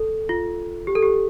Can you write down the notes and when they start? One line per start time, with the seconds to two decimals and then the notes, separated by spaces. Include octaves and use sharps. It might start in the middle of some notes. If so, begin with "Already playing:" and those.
Already playing: A4
0.29 F4
0.87 G4
0.95 A4
1.02 G4